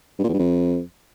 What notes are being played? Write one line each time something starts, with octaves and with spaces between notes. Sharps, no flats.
G2
A#2
E2
G2
F2